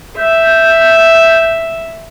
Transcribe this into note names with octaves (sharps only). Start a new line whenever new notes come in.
E5 G6